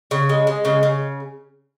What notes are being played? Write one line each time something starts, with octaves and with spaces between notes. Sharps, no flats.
C#3
G#3
G#3
C#3
C#3